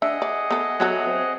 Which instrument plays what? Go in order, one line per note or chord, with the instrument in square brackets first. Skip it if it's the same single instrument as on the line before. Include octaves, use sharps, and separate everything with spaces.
[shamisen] D4 [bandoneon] G#4 D#5 F#5 [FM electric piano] E5
[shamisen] D5
B3 A4
[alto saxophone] F#3 [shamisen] B3 F#4 A4
[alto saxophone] C4